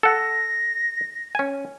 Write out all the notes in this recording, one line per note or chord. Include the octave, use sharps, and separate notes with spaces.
A4 F#5 A#6
C#4 G#5